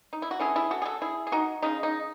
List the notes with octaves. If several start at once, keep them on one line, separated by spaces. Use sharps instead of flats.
D#4
E4
F#4
E3 A3 C#4 E4 G#4
E4 G#4
F#4 A4
G#4
F#4 A4
E4 G#4
G#4
D#4 F#4
C#3 G#3 C#4 D#4
D#4